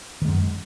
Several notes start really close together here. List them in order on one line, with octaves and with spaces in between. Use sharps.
D#3 G#3 F#2